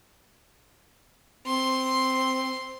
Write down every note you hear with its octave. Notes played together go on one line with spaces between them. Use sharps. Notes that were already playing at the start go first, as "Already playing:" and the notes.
C4 C6